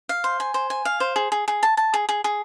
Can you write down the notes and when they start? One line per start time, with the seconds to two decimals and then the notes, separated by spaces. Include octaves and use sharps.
0.09 F5
0.24 C5
0.40 G#5
0.54 C5
0.70 G#5
0.85 F5
1.00 C5
1.16 G#4
1.32 G#4
1.48 G#4
1.63 A5
1.77 A5
1.94 G#4
2.09 G#4
2.24 G#4